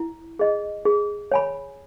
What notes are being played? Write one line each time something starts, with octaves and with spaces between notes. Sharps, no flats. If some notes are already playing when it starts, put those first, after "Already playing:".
Already playing: E4
G#4 D#5
G#4
C#5 G#5 B5